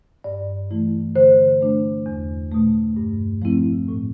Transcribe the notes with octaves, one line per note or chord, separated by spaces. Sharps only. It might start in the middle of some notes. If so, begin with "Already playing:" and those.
G2 D5
E3 A3 E4
D3 C5
A3 D4
E2
B2 A3
G2
F3 A3 C4 E4
A2